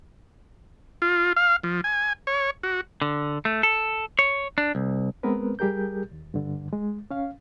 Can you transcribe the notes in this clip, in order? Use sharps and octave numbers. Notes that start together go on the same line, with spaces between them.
F4
F5
F3
G#5
C#5
F#4
D3
A3
A4
C#5
D4
C2
G#3 B3 C4 A#4 B4
G3 G4 G#4 A#4 G6
D#2
G2 D3
G#3
C#4 F5